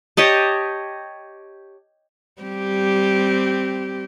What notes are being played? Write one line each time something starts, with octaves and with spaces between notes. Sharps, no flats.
G4 C#5 D#5 A5
G3 C4 G4